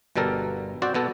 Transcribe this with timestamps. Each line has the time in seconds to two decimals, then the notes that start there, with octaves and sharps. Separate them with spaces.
0.16 G1 B2 G3 A4 A#4
0.82 C4 F#4 C5 D5 G5
0.94 B2 B3 A4